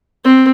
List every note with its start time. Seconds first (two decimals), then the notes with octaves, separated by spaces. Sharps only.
0.24 C4